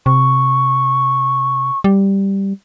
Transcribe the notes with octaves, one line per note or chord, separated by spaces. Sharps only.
C3 C#6
G3